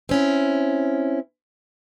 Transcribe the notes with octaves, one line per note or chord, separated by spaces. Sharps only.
C4 C#4 E4